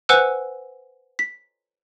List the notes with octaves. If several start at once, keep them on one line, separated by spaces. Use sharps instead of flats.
B4 C5 F#5 G#5 E6 F#6
B6